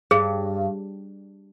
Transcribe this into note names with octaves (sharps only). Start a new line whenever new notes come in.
G2 G#4